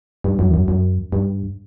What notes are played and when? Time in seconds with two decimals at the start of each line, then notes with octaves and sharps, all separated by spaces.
0.24 G2
0.39 F#2
0.49 E2
0.54 F#2
0.68 F#2
1.12 G2